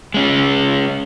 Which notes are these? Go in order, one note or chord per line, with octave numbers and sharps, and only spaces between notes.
G#3 C#4